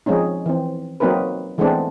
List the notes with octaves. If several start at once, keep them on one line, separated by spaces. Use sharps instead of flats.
F3 G#3 C4 C#4 D#4
E3 C4
F#3 A#3 C4 D#4 A#4 B4
E3 G#3 A3 B3 C4 D4